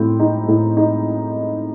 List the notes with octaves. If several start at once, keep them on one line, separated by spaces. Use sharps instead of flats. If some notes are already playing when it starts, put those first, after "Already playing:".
Already playing: A2 C4
D#4
A2
D#4